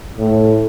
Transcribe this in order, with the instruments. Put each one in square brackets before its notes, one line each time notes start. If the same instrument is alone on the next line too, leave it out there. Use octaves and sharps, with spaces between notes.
[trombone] A2